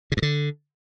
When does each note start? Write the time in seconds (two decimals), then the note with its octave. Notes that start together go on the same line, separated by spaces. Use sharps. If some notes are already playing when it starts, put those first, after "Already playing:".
0.12 C#3
0.17 G2
0.22 D3